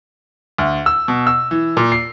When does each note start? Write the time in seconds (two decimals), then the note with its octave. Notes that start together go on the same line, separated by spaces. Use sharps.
0.58 D2
0.86 E6
1.08 B2
1.27 E6
1.51 E3
1.77 A#2
1.92 C7